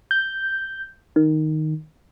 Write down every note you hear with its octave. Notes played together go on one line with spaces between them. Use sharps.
G6
D#3